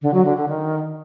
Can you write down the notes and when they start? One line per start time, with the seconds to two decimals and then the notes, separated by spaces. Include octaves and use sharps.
0.02 D3
0.14 F#3
0.25 D3
0.37 D3
0.49 D#3